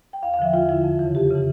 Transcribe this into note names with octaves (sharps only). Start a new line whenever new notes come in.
G5
E2 F5
F5
D3 F3 E5
E2 F4
D3 F3 E4
F2
C#3 E3
F2 G4
C#3 E3